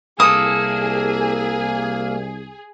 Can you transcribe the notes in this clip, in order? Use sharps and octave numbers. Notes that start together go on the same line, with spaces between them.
C2 A#3 G#4 A4 D#6